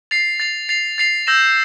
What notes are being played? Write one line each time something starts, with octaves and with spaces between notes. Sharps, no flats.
A6 C7 F7
A6 C7 F7
A6 C7 F7
A6 C7 F7
E6 G6 A#6 E7